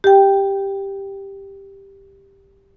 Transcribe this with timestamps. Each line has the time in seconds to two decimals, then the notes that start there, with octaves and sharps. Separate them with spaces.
0.04 G4 G5